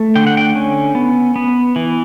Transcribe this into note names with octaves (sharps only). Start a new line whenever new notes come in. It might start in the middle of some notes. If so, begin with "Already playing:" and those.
Already playing: A3
D3 G5
F#5
G5
C#4
B3
B3
E3